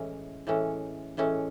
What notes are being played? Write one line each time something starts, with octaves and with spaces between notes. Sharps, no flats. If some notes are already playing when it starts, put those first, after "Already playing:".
Already playing: A2 E3 G#3 C#4
A2 E3 G#3 C#4
A2 E3 G#3 C#4